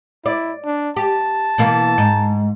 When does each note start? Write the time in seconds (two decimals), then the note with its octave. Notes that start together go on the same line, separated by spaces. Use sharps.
0.26 E4 D5
0.65 D4
0.97 G4 A5
1.58 B2 E3 A#3
1.98 G#2